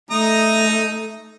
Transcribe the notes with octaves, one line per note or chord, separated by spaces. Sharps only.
A3 D#4 A#5 D#6